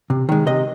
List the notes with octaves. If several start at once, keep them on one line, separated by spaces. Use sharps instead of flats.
C3
D#3 G#3
C3 D#5